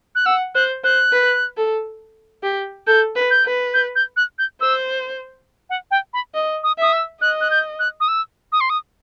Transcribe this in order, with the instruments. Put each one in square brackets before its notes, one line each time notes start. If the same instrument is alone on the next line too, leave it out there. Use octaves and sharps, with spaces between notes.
[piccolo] F#6
[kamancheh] F#5 [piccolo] E6
[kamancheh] C5 [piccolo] F#6
[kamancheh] C5 [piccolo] F#6
[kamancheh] B4
A4
G4
[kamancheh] A4 [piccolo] G6
[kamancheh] B4
[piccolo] G6
[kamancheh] B4
[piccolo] G6
G6
F#6
G6
[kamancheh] C5 [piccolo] E6
[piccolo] F#5
G5
B5
[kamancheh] D#5
[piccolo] D#6
[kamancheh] E5 [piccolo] D#6
[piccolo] E6
[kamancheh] D#5 [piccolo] F#6
[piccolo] F#6
G6
F#6
D#6
E6
D#6
C6
D#6